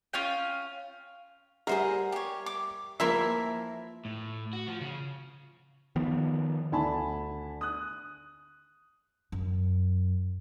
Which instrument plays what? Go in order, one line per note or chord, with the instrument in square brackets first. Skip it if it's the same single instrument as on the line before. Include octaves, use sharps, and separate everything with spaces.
[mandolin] C#4 F4 F5 G5
[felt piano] G3 E5 C7 [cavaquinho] G#4 C5 F#5 [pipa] A#4
[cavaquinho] G4 C#5
D6
[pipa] C3 E3 E5 [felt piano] F3 A#3 [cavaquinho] E4 A#4 C6
[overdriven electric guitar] A2
F#4
F3
C#3
[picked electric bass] D#3 F3 B3
[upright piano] D2 D4 G#5 A5 B5
D#6 F#6
[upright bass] F#2